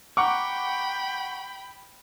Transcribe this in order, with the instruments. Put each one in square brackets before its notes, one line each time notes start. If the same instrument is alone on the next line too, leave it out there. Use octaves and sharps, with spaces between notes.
[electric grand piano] F#5 A#5 C#6 [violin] G5 B5 [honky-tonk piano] D6